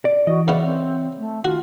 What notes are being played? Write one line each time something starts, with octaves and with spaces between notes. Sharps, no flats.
D5
E3 F#4 D#5
C#3 B3 C#5 D5 E5
C4
A3
D#3 F4 F#4